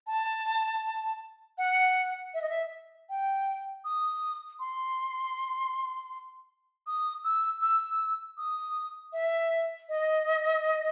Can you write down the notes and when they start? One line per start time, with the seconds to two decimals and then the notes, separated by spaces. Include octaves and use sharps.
0.07 A5
1.58 F#5
2.34 E5
2.42 D#5
2.49 E5
3.09 G5
3.85 D#6
4.60 C6
6.87 D#6
7.24 E6
7.62 E6
8.38 D#6
9.13 E5
9.89 D#5